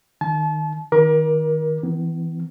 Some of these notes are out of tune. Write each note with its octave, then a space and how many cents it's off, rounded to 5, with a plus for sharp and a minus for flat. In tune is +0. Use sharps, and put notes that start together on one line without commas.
D#3 -10 A5 -35
D#3 +0 A#4 +30 D6 +0
E3 +0 B3 +40